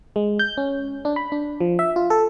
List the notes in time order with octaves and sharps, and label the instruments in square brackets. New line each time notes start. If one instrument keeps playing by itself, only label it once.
[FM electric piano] G#3
G6
C#4
D4
B5
D4
F3
E5
F4
A4